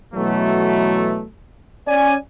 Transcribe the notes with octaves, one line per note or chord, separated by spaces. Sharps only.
B2 E3 F#3 A3
C#4 D5 G#5